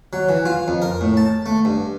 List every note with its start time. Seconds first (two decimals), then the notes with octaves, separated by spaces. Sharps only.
0.13 F#3
0.29 E3
0.45 F4
0.68 F2
0.82 A#4
1.01 A2
1.17 A5
1.46 A3
1.65 G2